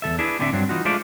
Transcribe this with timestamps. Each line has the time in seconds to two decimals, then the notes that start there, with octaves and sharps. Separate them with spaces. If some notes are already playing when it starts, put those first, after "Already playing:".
0.02 E2 E3 A4 E5
0.19 D4 E4 G#4 B4
0.39 A2 D3 A3 C4 D4 E5
0.53 G2 F#3 C4 D4
0.69 E3 D#4 F4 F#4
0.85 G#3 A3 D4 F4 C5 D5